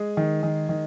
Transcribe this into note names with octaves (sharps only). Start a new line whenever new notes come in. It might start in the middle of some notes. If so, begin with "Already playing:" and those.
Already playing: G#3 G#4
D#3
D#3
D#3